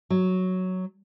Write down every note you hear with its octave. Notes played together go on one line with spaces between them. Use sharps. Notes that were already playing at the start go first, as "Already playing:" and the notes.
F#3